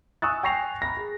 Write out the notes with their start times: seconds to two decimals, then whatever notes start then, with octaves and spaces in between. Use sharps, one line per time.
0.22 G#5 C#6 D#6 E6 F#6 A6
0.43 G5 G#5 C#6 A#6 C7 F7
0.82 A#5 B5 A#6
0.97 G#4